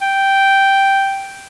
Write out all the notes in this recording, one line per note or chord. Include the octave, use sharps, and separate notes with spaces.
G5